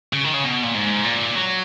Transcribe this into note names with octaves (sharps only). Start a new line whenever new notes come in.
C#3
D#3
C#3
B2
A#2
G#2
A#2
F#3